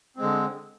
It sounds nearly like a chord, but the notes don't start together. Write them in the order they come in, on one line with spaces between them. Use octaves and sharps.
C4 G#3 D3